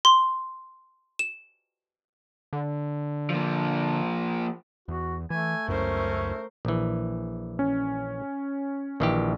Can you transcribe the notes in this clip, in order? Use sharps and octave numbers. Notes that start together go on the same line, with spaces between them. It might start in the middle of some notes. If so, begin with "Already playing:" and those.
C6
E7
D3
F3 A#3
E2 F#4
E3 A3 G#5
C#2 F#2 C#4 A#4 C5
A#1 E3
C#4
A#1 D#3 E3 G4